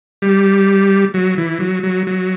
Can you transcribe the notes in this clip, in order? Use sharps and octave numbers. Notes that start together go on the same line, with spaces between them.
G3
F#3
E3
F#3
F#3
F#3